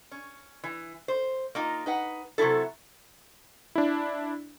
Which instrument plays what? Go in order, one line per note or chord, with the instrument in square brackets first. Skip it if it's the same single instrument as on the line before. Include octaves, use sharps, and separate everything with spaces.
[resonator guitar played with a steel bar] C#4
E3
C5
A#3 D#4 F4
D#4 B4 F#5
C3 F#3 A3 E4 A4
[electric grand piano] D4 E4